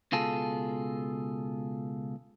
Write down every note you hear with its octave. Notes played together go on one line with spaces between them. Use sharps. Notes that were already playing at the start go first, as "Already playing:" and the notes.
C#2 B2 F4 G#4 A4